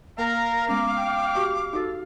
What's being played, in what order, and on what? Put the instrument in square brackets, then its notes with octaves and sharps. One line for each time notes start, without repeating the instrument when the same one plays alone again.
[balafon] A#3 [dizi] A#4 [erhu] F5 [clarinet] A#5
[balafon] G#3 B3 C#4 [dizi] D6
[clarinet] G5
[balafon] F#4 G4 C#6
[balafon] D#4 F#4 [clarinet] A4